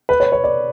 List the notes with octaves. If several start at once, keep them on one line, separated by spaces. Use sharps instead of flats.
B4
C#5
C#5
D5